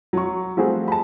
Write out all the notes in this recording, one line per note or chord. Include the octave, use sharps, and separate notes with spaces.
F#3 C#6
F3 G3 A3 C4 F#4 G#4
A5 B5